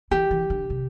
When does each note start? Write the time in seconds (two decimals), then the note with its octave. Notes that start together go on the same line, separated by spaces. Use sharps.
0.11 E3 G4
0.31 E3
0.50 D3
0.70 C3